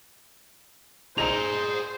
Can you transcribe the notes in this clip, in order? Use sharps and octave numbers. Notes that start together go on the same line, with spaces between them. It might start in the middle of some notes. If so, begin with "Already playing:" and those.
A#2 D#4 G#4 C5 A#5 F7